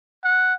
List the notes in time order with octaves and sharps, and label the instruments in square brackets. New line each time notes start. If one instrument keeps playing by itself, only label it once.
[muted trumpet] F#5